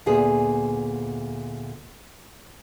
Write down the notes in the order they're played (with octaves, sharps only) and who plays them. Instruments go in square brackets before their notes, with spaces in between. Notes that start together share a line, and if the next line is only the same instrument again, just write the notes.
[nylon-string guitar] D2 A#2 B3 G#4